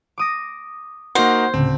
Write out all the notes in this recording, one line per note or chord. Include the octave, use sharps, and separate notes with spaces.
D6 D#6 A#6
A#3 D#4 F#4 C5 F#5
D2 A2 C#3 C4